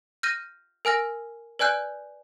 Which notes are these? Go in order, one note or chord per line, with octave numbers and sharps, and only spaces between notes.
F6 G6 A#6 D#7
A#4 G#5 F6 A#6
B4 D5 G#5 F#6 G6